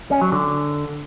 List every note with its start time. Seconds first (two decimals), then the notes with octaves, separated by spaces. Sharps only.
0.11 C#4
0.21 F#3
0.32 D3